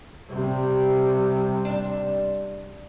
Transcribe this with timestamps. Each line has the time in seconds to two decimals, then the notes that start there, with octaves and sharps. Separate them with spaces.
0.31 C3 G3
1.65 D4